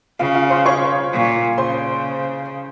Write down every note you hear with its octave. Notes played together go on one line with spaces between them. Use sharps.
C#3 F4 F5
F4 F5
C5 C6
C#5 C#6
A#2
C#3 C5 C6